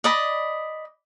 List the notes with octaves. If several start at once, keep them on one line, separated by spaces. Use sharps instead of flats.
D5 D#5 B5